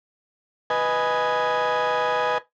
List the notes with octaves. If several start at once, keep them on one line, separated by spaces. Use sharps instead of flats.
B4 D#5 G#5